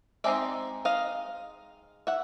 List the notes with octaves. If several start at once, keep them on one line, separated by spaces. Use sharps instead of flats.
G#3 C4 D#4 D5 E5
D#5 F5
E5 F#5